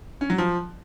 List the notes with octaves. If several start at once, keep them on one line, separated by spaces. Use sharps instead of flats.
C#4
F#3
F3